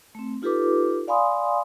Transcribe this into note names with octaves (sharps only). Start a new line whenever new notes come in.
A3 C4
D#4 F4 G4 A4 B4 D6
D5 F5 G#5 B5 C6 D#6